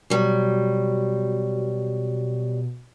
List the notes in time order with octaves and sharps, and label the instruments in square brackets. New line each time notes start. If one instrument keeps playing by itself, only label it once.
[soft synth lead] B2 [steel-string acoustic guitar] F#3 G3